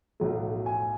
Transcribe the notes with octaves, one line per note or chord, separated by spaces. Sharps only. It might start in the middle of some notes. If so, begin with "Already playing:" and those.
B1 A2 F#3 A3
G#5